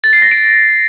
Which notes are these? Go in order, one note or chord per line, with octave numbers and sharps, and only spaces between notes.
A6
C7
A#6
D7